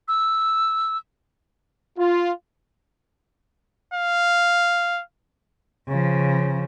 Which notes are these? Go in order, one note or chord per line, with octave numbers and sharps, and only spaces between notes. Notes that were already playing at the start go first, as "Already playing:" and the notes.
E6
F4
F5
C#3 F3